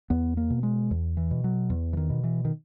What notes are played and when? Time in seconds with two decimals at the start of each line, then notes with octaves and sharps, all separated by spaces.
0.10 E2 B3
0.37 A#3
0.50 B2
0.63 G#3
0.91 E2
1.17 E3
1.31 B2
1.44 F#3
1.70 E2
1.93 E3
1.97 D#3
2.10 B2
2.24 E3
2.45 D#3